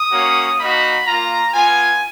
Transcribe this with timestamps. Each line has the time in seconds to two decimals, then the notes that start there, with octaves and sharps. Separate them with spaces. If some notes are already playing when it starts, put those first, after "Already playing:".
Already playing: D#6
0.11 A#3 C#4 F#4
0.58 A#3 D#4 F#4 B5
1.06 A#3 F4 A#5
1.53 B3 F4 G#5